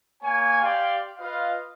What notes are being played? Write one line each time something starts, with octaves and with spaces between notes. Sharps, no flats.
A#3 C#5 G#5
G4 D5 F5 G5 C6
F4 B4 D#5 F5